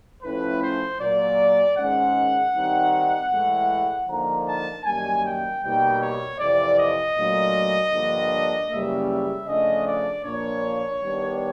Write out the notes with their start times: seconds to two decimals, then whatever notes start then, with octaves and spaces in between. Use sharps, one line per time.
0.23 A2 F3 A3 C#4 E4 B4
0.61 C5
1.00 A#2 F#3 A#3 D5
1.77 G#2 D#3 G#3 C#4 F#5
2.54 D#3 G3 C4 D#4
3.32 A2 E3 G#3
4.08 D3 F3 A#3 D#4 A#5
4.46 A5
4.84 F#2 D#3 G3 A#3 G#5
5.24 G5
5.63 B2 G3 A#3 D#4 G5
6.00 C#5
6.38 F2 C3 E3 D5
6.77 D#5
7.16 A#2 F#3 A3 D4
7.93 G2 D3 F3 A#3 D4
8.69 F#2 C#3 E3 G3 A#3 E5
9.08 E5
9.47 C#3 F3 A3 D4 D#5
9.86 D5
10.24 A#2 F3 A#3 D4 C#5
11.01 D#3 G3 B3 D4